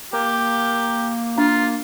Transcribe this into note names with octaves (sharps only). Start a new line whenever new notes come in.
A#3 G4
D4 F4